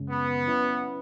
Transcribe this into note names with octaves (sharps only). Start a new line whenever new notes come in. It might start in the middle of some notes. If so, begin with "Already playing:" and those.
Already playing: F#2 C#3 G#3 C#4
B3
F#3 C#4 E4 B4